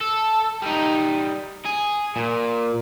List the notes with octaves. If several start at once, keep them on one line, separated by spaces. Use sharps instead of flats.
A4
G3 D#4
G#4
A#2